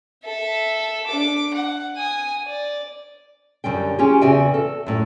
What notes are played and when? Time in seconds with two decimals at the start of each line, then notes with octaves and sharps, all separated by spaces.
0.24 A4 E5
1.07 D4 D6
1.54 F#5
1.97 G#5 D#6
2.46 D5
3.64 F#2 D3 G3 G5
3.99 C#4 F4 G4 G#4
4.21 E2 C#3 F#4 E5 G5 G#5
4.54 A4
4.86 F#2 A2